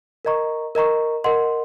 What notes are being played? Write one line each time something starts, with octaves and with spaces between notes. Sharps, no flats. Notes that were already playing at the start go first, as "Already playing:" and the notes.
A#4 D#5 A#5 C#6
A#4 D#5 A#5 C#6
A#4 D#5 F#5 C6